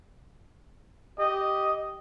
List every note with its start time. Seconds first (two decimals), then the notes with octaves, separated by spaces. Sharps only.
1.19 G4 D#5